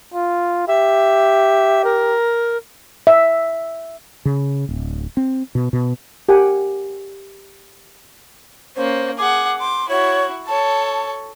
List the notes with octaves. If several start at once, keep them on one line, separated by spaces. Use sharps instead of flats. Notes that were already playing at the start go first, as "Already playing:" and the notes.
F4
G4 E5
A#4
E5
C#3
D1
C4
B2
B2
G4 A#4 F#5 G#5
A#3 C#4 C5
G#4 F#5 D6
C6 D6
E4 F#4 C#5
A4 C#5 A5